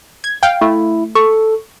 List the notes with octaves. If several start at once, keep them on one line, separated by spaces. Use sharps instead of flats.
G#6
F5 G5
A3 E4
A4 C#6